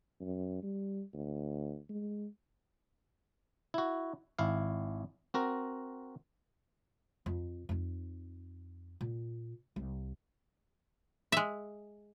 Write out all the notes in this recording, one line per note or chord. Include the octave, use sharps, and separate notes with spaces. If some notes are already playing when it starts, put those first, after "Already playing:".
F#2
G3
D2
G#3
E4 F#4
G#1 E4 F5
C4 F#4 A#4
F2
F2 D#4
A#2
C2
G#3 E5